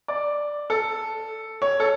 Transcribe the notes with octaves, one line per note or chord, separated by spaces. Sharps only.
D5
A4
C#5
A4